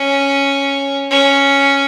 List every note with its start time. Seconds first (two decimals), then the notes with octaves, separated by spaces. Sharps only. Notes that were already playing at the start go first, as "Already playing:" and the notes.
Already playing: C#4
1.11 C#4